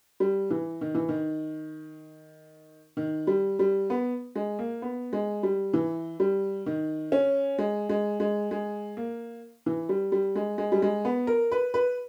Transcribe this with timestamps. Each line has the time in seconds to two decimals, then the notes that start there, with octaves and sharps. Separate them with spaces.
0.20 G3
0.51 E3
0.81 D#3
0.95 E3
1.09 D#3
2.97 D#3
3.27 G3
3.59 G3
3.90 B3
4.35 G#3
4.59 A#3
4.82 B3
5.13 G#3
5.43 G3
5.74 E3
6.20 G3
6.66 D#3
7.12 C#4
7.58 G#3
7.89 G#3
8.20 G#3
8.51 G#3
8.97 A#3
9.66 E3
9.89 G3
10.12 G3
10.35 G#3
10.58 G#3
10.72 G3
10.82 G#3
11.05 B3
11.27 A#4
11.52 B4
11.74 B4